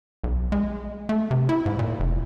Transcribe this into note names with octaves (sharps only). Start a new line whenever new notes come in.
B1
G#3
A3
C3
E4
G#2
A#2
F1